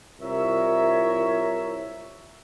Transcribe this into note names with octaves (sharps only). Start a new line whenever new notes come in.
C2 E4 F4 A#4 C#5 E5